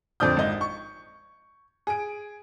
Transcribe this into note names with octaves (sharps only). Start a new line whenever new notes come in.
F2 D3 C4 D5 D#6 G6
G#1 D#5
C#6
G#4 D7